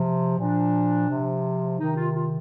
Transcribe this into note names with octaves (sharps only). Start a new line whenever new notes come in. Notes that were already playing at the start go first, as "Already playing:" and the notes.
Already playing: C3 F3
A#2 F3 D4
C3 F3
C3 D#3 D#4
F4
F4